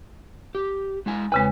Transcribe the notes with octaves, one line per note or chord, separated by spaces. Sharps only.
G4
G#3 E4 G#5
E2 C#3 G#3 C4 B4